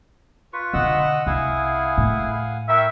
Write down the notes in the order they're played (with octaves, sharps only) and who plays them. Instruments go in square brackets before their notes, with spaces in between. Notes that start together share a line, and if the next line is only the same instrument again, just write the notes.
[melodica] F4 B4 C#6
[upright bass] B2 D3 [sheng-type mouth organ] D#5 F#5 E6
[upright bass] C2 [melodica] E4 G#4 [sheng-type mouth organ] F5 F#5 G#5
[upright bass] A2
[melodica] E4 A#4 [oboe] E5 [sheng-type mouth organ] G5 C#6